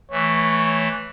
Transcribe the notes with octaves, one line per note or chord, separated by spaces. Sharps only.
E3 A3 C#5